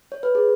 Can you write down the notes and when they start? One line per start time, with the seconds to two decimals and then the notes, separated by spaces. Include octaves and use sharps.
0.12 C#5
0.23 B4
0.35 G#4